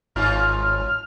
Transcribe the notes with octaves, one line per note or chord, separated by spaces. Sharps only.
G#1 G2 C#4 F4 F6